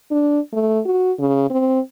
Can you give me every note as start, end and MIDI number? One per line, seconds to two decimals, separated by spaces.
0.11 0.40 62
0.53 0.80 57
0.86 1.12 66
1.20 1.49 49
1.51 1.80 60